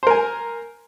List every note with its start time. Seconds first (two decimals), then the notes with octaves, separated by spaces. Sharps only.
0.03 C5
0.07 A#4
0.11 G#5